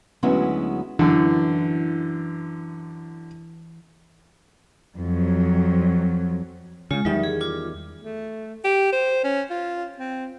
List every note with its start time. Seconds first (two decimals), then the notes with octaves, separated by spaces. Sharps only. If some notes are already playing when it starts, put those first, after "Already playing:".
0.23 D2 F#3 G#3 B3 C#4 E4
0.99 F#2 D3 E3
4.98 F2 F#3
6.91 C#3 G#3 F4
7.05 E2 D#3 F#3 G3 D#4 E5
7.24 G#4
7.41 F4 D6
8.01 A3
8.64 G4
8.93 C5
9.24 C#4
9.50 F4
9.97 C4